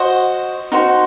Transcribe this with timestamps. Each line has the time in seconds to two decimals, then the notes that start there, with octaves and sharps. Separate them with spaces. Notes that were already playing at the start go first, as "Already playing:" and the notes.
Already playing: F#4 C5 D#5
0.72 D#4 F#4 C5